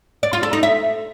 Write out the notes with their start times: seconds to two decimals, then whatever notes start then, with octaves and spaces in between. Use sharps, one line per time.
0.23 D5
0.33 F4
0.43 A4
0.53 D#4
0.63 E5